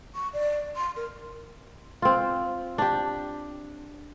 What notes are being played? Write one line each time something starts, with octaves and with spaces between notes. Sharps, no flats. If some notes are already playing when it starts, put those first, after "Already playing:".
C#6
D5
C6
A#4
C4 F4
D4 G4